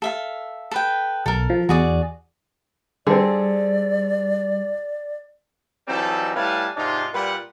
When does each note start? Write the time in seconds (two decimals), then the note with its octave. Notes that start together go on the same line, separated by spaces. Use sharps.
0.02 A4 E5 F5
0.71 A4 B4 G5
1.26 B1 A4 A#4
1.50 F3
1.69 E2 F#4 G#4 D5
3.07 D3 G3 C4 G#4 D5
5.88 E3 F#3 G3 C4 D#4 A4
6.36 A2 G3 B4 F5 G#5 A5
6.77 G#2 C3 D4 D#4 F4
7.14 A#2 G3 B4 F#5